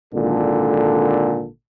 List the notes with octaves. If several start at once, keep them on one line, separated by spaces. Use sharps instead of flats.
G#1 A#2 D3 A4